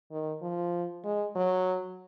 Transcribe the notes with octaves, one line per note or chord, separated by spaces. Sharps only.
D#3
F3
G#3
F#3